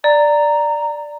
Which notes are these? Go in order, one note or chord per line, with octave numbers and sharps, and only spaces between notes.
D5 A#5